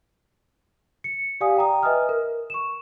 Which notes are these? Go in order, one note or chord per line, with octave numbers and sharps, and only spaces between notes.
C#7
G4 D5 F5 G#5 D#6
G5 A#5 D#6
B4 D#5 E5 G#5 D#6 F6
A#4
C#6 E7